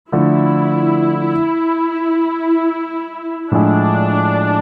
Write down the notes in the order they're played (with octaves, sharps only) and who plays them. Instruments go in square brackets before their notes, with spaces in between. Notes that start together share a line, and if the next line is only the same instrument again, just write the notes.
[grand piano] D3 F3 A3 [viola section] E4
[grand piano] A2 F3 G#3 [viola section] D4